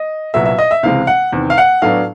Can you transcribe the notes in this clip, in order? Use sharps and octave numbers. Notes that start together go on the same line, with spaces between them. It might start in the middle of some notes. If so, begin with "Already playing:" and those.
Already playing: D#5
C2 A#2 F#3 B3 E5
E5
D#5
E5
C#2 C3 E3 G#3 F5
F#5
E2 C3 D#3
F5
F#5
A2 F#3 B3 D4 F5